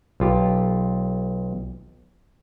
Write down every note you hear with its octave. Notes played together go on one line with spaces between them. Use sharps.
B1 F4 G4